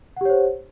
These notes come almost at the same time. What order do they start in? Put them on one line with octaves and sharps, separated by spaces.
F#5 G4 C#5 C5